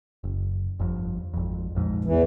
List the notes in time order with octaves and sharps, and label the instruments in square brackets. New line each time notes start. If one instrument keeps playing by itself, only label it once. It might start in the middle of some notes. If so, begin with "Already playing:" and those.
[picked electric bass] F#1
G1 F2
G#1 F2
A#1 F2 G#2
[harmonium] E2 E3